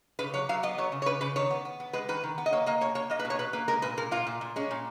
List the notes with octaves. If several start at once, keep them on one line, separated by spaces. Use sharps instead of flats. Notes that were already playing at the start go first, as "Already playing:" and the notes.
C#3 B4
F#3 C#5
F#3 F5
B3 D#5
F#3 C#5
C#3
C#5
C#3 B4
C#3 B4
D#3 C#5
B3
B3
B3
G#3 B4
D#3 B4
D#3
B3
D#5
A#3 C#5
A#3 D#5
B2 C#5
A#3 C#5
A#3 D#5
B4
B2
C#5
B2 B4
A#3 B4
G#3 A#4
A#2 B4
A#2 A#4
A#2 F4
A#2
A#2
G#3 C#4
A#2